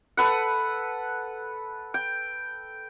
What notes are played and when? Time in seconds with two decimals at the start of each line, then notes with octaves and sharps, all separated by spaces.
0.17 A4 B4 F#5
1.94 G5